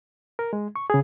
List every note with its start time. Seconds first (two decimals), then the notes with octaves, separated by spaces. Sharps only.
0.39 A#4
0.53 G#3
0.76 C#6
0.90 C#3 G#4